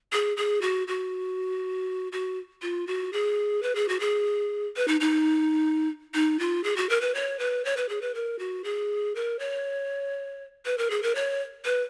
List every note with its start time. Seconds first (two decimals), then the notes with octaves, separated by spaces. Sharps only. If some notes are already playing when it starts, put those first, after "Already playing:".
0.12 G#4
0.37 G#4
0.61 F#4
0.88 F#4
2.12 F#4
2.62 F4
2.87 F#4
3.13 G#4
3.63 B4
3.75 G#4
3.89 F#4
4.00 G#4
4.76 B4
4.88 D#4
5.01 D#4
6.14 D#4
6.40 F4
6.64 G#4
6.77 F#4
6.89 A#4
7.01 B4
7.15 C#5
7.39 B4
7.65 C#5
7.77 B4
7.89 G#4
8.02 B4
8.15 A#4
8.39 F#4
8.64 G#4
9.15 A#4
9.39 C#5
10.66 B4
10.78 A#4
10.90 G#4
11.03 A#4
11.15 C#5
11.65 B4